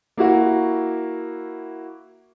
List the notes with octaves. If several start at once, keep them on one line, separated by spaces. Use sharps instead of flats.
A#3 E4 F#4